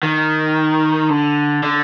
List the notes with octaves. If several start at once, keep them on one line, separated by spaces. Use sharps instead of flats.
D#3
D3
D3